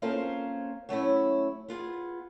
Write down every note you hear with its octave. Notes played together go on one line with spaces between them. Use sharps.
A#3 C4 C#4 F4 A4 C5
F#3 A3 C#4 E4
B3 F4 G#4